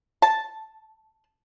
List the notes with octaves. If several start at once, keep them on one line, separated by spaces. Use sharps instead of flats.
A5